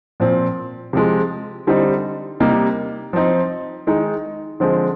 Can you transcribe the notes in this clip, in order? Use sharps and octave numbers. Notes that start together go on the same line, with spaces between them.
A#2 F3 C4
C3 F3 G#3
D3 G3 C4 D#4
C3 G3 A#3 D#4
F3 C4 D#4
D#3 G#3 D#4
D3 F3 G#3 C4